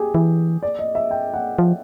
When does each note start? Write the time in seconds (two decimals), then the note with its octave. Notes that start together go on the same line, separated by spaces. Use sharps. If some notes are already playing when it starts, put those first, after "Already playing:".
Already playing: G4 G#4
0.15 E3
0.63 D5
0.79 D#5
0.95 E5
1.11 G5
1.34 F#5
1.59 F3